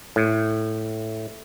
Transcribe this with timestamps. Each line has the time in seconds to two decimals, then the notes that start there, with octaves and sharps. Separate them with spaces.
0.16 A2